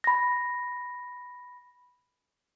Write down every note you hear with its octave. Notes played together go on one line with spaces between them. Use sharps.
B5 A#6